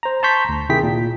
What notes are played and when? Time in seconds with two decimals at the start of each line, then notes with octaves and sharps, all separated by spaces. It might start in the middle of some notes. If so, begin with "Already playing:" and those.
0.03 C5 A#5
0.23 A5 A#5 C6 C#6 G6 B6
0.49 D2
0.69 C3 D#3 E4 G#4 G5 B6
0.83 A#2